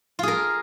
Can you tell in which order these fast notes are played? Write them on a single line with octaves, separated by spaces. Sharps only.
F4 G#4 A#4